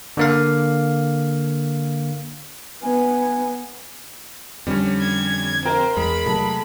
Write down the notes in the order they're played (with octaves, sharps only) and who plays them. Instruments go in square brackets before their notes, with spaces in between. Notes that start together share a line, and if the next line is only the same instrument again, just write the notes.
[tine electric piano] D3 A#3 F5
[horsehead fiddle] B3 [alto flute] G#5
[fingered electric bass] F2 D3 [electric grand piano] G3 C#4
[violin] G#6
[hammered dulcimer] A#4 F5 [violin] C5 [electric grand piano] G5
[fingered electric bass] E2 [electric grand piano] G#3 [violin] B5
[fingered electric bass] C3 F#3 A3 [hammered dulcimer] A4